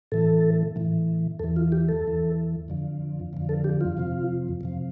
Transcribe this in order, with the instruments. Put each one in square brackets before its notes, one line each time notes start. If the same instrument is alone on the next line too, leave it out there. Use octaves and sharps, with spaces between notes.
[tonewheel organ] A2 E3 A4
A2 E3
E2 E3 A4
F4
G4
A4
E2 E3
F2 D3 F3
F2 D3 F3
A4
G4
F4
F2 C3 F3
F2 C3 F3